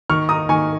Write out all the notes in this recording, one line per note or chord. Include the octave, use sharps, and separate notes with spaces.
D#3 C#6 F6
D#4 A#5 D#6
D#3 G#5 C#6